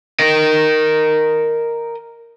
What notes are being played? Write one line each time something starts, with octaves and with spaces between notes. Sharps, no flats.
A#4 D#5